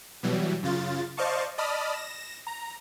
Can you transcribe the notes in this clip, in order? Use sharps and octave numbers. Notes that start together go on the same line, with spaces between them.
B2 E3 F#3 G3
F#2 C#3 F4 A6
C5 D5 D#5 F5 A5 C#6
D5 D#5 A5 B5 D#6 F6
A#6 E7
A#5